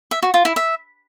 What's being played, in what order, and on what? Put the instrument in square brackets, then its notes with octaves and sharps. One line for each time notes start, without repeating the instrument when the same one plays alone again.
[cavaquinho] E5
F#4
F4
E4
E5